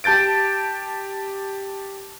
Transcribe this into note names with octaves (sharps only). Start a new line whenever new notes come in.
G4 A5 G6 A6 D7